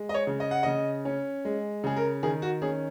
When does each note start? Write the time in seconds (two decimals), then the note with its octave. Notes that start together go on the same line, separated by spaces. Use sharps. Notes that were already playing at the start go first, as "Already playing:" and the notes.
Already playing: G#3
0.09 D#5
0.14 C#5
0.27 C#3
0.40 D#5
0.51 F#5
0.63 C#3 D#5
1.05 C#4
1.45 G#3
1.84 C#3 G#4
1.96 A#4
2.23 D#3 G#4
2.42 F#4
2.62 C#4 G#4